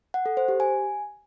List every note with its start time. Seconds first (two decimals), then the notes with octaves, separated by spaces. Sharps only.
0.14 F#5
0.26 A4
0.37 C5
0.48 G4
0.60 G#5